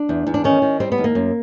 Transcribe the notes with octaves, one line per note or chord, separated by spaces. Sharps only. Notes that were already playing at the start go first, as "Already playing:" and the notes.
Already playing: D4
E2
E2
D4
D#3 C#4
D#3
G3 C4
B3
D#2
A#3
F#2